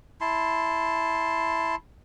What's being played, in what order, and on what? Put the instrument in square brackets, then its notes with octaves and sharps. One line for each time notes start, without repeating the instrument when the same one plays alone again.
[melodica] E4 A5 C6